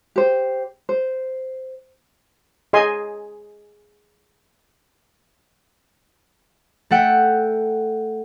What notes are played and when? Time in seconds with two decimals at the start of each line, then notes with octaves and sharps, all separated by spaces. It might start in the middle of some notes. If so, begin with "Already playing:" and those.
0.16 G4 C5
0.89 C5
2.73 G#4 D#5 G#5 C6
6.90 A3 A4 F#5 G5